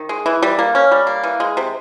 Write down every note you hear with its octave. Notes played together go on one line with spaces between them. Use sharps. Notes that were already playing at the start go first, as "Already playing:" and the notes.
Already playing: D#3
G#3
E3
G3
A#3
C#4
G3
A#3
E3
G#3
C3